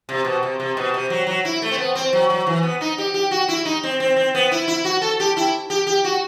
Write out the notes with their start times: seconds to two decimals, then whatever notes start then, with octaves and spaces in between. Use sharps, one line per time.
0.09 C3
0.25 B2
0.43 C3
0.60 C3
0.77 B2
0.94 C3
1.10 F#3
1.27 F#3
1.45 E4
1.62 A3
1.71 C4
1.78 B3
1.95 C4
2.13 F#3
2.30 F#3
2.47 E3
2.63 B3
2.81 D#4
2.98 G4
3.14 G4
3.31 F#4
3.48 E4
3.65 D#4
3.84 C4
4.00 C4
4.16 C4
4.35 B3
4.51 E4
4.68 E4
4.85 F#4
5.02 A4
5.20 G4
5.37 E4
5.70 G4
5.87 G4
6.04 F#4